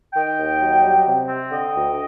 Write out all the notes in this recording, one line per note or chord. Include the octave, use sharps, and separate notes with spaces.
D#3 D#5 G5
D#2
F#3
G3
C3
C4
D3 D#5 G5
D2